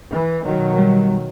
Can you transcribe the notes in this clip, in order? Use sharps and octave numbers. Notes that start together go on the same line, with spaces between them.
E3
B2 D#3 F#3
G3